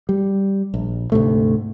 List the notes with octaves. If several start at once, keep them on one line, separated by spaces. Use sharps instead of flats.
G3
A#1
D2 G#2 C3 A3